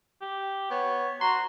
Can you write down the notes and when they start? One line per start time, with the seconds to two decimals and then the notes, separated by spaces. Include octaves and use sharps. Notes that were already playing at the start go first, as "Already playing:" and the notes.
0.22 G4
0.71 B3 C#5
1.21 F#4 A#5 C6